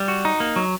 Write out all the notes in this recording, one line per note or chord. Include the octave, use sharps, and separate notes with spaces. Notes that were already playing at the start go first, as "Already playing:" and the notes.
Already playing: G3
F#4
D#4
A#3
F#3